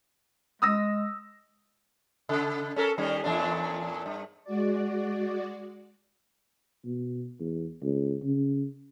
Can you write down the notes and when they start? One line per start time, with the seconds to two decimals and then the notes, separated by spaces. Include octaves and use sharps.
0.62 G#3 D#6 E6 A#6
2.29 C#3
2.76 C#4 A4 A#4
2.98 D#3 G3 C#4
3.24 E2 A#2 D4
4.06 G2
4.44 G#3 F#4 D5
6.85 B2
7.40 E2
7.82 C#2
8.23 C#3